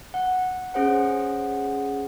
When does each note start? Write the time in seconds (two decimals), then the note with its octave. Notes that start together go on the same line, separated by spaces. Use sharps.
0.14 F#5
0.74 C#4 G#4 C5 F#5